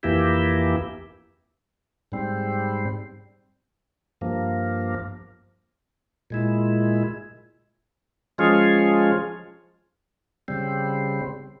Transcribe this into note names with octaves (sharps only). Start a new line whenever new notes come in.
F2 E3 A#3 E4 G4
G#2 G3 C4
G2 F3 A#3
A#2 G#3 E4
F3 G#3 C#4 F4 G#4
C#3 G3 C4